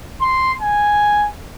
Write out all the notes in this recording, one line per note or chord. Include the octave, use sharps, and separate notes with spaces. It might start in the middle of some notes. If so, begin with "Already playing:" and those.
C6
G#5